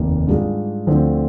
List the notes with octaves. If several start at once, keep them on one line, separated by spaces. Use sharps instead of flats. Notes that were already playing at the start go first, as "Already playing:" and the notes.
Already playing: F1 D#2 D#3 A#3
G#2 G3 D4 F4 G#4
D2 D3 F3 C4